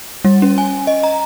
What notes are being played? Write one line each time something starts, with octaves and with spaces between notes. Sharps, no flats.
G3
C#4
G#5
D#5
A#5